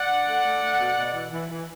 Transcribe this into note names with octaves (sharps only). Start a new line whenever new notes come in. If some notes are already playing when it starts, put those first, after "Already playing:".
Already playing: D5 F#5
D4
A3
A3
A3
B2
B2
E3
E3
E3